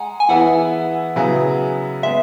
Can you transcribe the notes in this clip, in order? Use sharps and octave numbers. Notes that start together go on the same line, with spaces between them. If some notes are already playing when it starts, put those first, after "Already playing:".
Already playing: G#3 F#5 G#5 A#5
G#5
E3 B3 E4 G#4 F#5
C#3 F#3 B3 E4 G#4
G#3 B3 E5